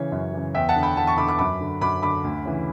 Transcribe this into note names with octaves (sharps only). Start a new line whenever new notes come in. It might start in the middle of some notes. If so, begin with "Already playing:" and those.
Already playing: C#3 E3 C#5
F#2
C#3 E3
E2 E5 G5
F#5 A5
D3
G5 B5
E2 F#5 A5
A5 C#6
D3 B5 D6
B5 D6
F#2 B5 D6
D3
F#2 B5 D6
D3 B5 D6
D2
C#3 E3